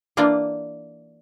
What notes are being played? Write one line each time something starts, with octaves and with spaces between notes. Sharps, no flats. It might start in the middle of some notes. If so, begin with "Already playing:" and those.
E3 A#3 D4 F4 D5